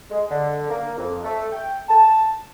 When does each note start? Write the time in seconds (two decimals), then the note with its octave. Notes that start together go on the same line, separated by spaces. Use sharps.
0.11 G#3
0.30 D3
0.70 A#3
0.97 F2
1.25 A3
1.52 G5
1.89 A5